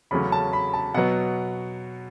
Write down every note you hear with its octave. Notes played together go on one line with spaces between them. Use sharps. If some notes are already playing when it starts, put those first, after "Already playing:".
E2 C#3 F#3 A3 C#4 B5
A5
B5
A5
B2 F#3 B3 F#5